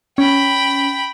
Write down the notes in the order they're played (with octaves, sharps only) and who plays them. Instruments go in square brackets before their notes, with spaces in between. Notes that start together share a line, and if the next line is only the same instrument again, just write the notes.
[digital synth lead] C#4 [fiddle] G5 B5